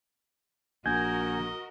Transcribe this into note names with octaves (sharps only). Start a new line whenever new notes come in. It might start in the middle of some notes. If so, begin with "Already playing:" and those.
A#1 F#4 A#4 D#5 G#5 G6 G#6